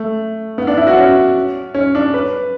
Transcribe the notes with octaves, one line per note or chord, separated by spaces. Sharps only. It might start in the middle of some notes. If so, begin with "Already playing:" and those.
Already playing: A3
B3
D4
E4
F#4
C#4
C#4
D4
B4